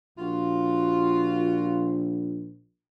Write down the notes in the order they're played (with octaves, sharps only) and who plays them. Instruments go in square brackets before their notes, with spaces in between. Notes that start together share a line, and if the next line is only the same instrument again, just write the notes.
[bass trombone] A#1 [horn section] F4 F#4